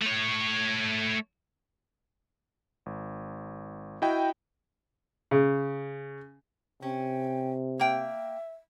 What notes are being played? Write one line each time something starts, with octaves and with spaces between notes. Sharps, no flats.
A3 C#5
G#1
E4 F#4 D#5 G5
C#3
C3 C#4 G5
A#3 E5 G5